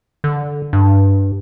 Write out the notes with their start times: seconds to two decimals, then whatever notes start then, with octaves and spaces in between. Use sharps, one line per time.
0.24 D3
0.73 G2